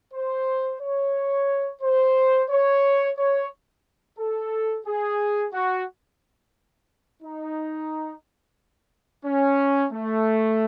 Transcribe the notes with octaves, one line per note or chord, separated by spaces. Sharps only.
C5
C#5
C5
C#5
C#5
A4
G#4
F#4
D#4
C#4
A3